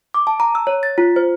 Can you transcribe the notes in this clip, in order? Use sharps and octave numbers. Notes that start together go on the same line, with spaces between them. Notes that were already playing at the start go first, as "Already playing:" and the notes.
D6
A5
A#5
E6
C#5
A6
F4
C5